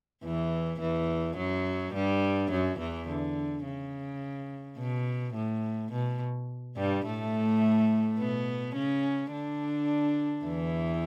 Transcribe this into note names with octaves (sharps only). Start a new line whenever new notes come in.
E2 E3
E2 E3
F#2 F#3
G2 G3
F#2 F#3
E2 E3
D3
C#3
B2
A2
B2
G2 G3
A2 A3
B2 B3
C#3 C#4
D3 D4
E2 E3